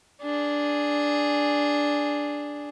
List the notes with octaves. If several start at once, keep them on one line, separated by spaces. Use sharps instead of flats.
D4 G#4